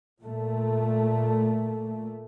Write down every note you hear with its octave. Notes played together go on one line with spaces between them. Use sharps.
A#2 A3